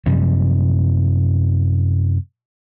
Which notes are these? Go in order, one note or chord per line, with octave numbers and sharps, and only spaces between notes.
F#2 C3 F3 G3